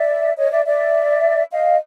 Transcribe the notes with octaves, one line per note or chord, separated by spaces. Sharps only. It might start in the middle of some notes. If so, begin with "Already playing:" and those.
Already playing: D5 E5
C#5 D#5
D5 E5
D5 E5
D#5 F5